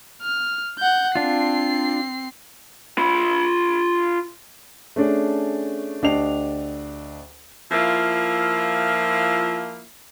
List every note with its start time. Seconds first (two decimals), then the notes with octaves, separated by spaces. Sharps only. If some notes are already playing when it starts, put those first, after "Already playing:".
0.22 F6
0.79 F#5 G6
1.15 C4 D4 F4 C7
2.98 F4 B5
4.96 A3 C#4 D4 G#4
6.02 D2 D4 G4 D#5 C7 F7
7.72 F3 A#3 E4 F4 E5